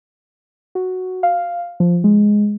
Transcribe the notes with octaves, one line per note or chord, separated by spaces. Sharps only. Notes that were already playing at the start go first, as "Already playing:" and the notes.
F#4
F5
F3
G#3